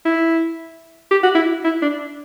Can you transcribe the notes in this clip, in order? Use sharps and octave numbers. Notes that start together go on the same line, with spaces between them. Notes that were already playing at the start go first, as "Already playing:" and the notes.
E4
G4
F#4
E4
E4
D4